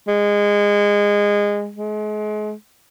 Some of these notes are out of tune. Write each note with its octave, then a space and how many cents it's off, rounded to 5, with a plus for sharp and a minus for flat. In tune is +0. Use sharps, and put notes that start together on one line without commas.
G#3 -20
G#3 +35